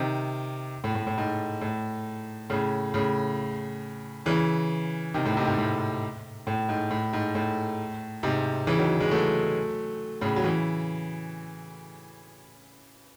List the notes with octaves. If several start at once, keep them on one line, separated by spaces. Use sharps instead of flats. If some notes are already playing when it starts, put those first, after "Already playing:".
Already playing: C3 D#3
A2
A2
A2
G#2
A2
A2 C#3
A2 C#3
C#3 E3
C3 D#3
A2
G#2 C3
G#2 C3
A2
A2
G#2
A2
G#2
A2
G#2 C3
C#3 E3
D#3 F#3
E3 G#3
F#3 A3
A2 C#3
F#3
C#3 E3